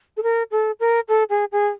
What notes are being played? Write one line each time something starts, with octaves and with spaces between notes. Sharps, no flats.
A4
A#4
A4
A#4
A4
G#4
G#4